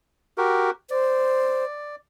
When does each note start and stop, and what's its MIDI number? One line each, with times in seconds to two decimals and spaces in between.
0.38 0.70 66
0.38 0.70 67
0.38 0.70 70
0.91 1.65 72
0.91 1.96 74